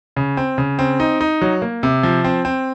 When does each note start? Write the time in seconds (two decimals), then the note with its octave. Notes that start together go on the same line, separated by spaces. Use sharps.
0.16 C#3
0.37 C4
0.58 C#3
0.79 C4
1.00 D#4
1.21 D#4
1.41 F#3
1.62 A#3
1.83 C3
2.03 F3
2.24 C4
2.45 C4